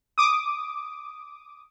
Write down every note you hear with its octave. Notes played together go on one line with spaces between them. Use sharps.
D6 D#6